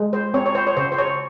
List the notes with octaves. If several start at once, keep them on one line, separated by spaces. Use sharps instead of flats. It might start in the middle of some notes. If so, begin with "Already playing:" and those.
Already playing: G#3
C5
C4 C#5
C#5
C5
C#5
C#3 C5
C5
C#5